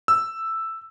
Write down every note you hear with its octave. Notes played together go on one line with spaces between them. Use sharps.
E6